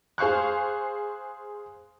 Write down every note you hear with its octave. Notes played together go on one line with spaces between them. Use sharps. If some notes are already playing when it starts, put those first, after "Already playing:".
G#4 C5 F5 C#6 F#6